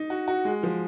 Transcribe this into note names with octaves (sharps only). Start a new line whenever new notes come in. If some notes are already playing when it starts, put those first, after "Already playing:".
Already playing: D#4
F#4
F#4
G#3
F3